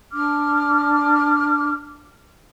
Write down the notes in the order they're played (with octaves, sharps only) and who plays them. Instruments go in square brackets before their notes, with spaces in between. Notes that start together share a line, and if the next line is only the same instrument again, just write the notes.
[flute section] D4 D6 F6